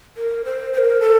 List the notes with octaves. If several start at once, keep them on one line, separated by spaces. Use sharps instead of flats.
A#4
C5
C5
A#4
A4